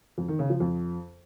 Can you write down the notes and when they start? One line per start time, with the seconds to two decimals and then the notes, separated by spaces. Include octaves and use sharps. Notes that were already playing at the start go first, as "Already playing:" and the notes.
0.18 F2
0.28 D#3
0.39 C#3
0.50 F3
0.60 F2